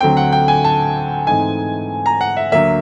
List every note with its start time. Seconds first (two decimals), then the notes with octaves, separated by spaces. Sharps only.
0.01 D2 D3 F#3 A3 C4 G5
0.17 F#5
0.33 G5
0.48 G#5
0.64 A5
1.27 G#2 E3 A3 C4 D#4 G#5
2.06 A#5
2.21 F#5
2.37 E5
2.52 D2 D3 F#3 A#3 E5